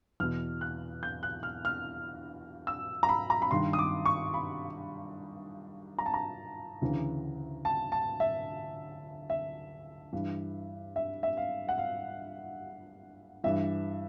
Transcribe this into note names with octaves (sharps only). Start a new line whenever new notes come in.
E2 B2 F6
F#6
G6
F#6
F6
F6
E6
A#5
B5
A#5
B5
G2 D#3 C6
D#6
D6
C#6
B5
A#5
A5
A#5
D2 C#3 E3
A5
A5
E5
E5
G2 E3
E5
E5
F5
F#5
F5
G2 E3 E5